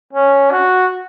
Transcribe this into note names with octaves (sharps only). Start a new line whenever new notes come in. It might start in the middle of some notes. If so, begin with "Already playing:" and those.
C#4
F#4